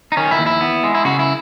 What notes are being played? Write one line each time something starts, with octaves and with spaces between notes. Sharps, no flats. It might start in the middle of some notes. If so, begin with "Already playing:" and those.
D#4
D#3 C#4
E4
D#2
E4
B3
G#3
E4
C#3 F#4
E4